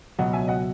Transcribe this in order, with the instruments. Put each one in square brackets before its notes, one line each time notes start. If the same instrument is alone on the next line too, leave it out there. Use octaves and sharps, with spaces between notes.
[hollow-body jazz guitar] C#2 B2 F#3 [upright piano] D#5 F#5
[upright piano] E5 G#5
D#5 F#5